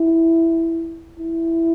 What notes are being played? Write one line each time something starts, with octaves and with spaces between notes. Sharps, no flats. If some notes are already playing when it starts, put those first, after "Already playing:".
Already playing: E4
E4